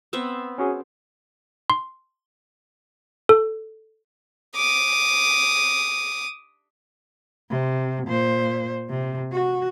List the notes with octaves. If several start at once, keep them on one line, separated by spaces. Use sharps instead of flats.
B3 C4 E5
C#4 F#4 G#4
C6
A4
D6 D#6
C3
A#2 C5
C3
F#4